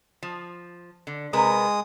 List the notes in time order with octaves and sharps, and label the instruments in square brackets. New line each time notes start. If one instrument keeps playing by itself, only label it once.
[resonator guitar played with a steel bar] F3
D3
[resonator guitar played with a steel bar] C3 A#4 B4 [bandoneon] G#3 D#6